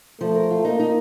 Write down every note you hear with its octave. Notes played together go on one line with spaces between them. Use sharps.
F3 A3
A#4
F4
A#3 D#4
D#4